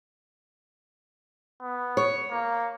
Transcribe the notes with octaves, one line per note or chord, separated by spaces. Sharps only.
B3
C#5
A#3